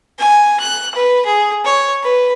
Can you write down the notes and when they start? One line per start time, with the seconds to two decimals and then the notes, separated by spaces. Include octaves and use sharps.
0.19 G#5
0.60 F#6
0.95 B4
1.26 G#4
1.65 C#5
2.03 B4